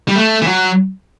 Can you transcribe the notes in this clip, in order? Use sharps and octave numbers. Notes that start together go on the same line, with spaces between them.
G3
A3
E3
F#3